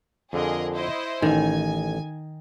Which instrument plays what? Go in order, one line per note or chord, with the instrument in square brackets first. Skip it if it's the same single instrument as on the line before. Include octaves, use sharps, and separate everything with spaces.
[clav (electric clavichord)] F2 D3 [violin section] G#4 A#4 D#5
[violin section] E4 C5 D#5
[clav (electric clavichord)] A1 [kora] D#3 [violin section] G#5